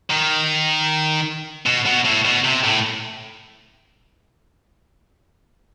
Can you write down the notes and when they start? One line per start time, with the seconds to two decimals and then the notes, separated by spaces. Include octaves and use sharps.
0.10 D#3
1.66 B2
1.86 B2
2.06 A2
2.25 B2
2.45 C3
2.64 A2